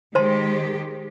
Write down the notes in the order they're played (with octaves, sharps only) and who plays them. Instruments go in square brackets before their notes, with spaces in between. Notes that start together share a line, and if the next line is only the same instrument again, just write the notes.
[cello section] D#3 G#3 G4 [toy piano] C5 A5 C6